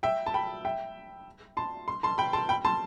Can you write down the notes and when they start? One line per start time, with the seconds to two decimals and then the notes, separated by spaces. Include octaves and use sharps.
0.03 E5 G5
0.26 A5
0.34 G5 B5
0.65 E5 G5
1.57 A5 C6
1.88 C6
2.03 A5 C6
2.18 G5 B5
2.33 A5 C6
2.49 G5 B5
2.65 A5 C6